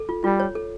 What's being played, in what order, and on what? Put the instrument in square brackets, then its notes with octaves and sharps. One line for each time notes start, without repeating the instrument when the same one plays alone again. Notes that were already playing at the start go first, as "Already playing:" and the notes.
Already playing: [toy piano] A4
F4
[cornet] G3 [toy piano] F4
[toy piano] C#5
A4